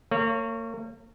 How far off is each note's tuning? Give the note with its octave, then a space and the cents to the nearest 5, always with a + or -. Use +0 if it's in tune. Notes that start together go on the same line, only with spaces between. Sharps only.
A#3 -35 C#5 +0